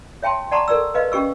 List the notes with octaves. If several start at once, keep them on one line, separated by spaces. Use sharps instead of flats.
C#5 E5 G5 A5 C6
D5 F#5 A5 A#5 C6 C#6
A4 A#4 D5 E6
B4 D#5 F5
C#4 G4 C#6 E6